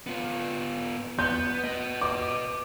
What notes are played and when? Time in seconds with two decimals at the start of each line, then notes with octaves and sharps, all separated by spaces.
0.07 B3 F4
1.19 B3 G6
1.64 B4 D#5
2.01 D6